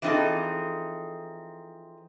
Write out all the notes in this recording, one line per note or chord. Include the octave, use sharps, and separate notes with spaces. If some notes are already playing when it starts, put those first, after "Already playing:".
E3 F3 C4 D#4 G#4 A4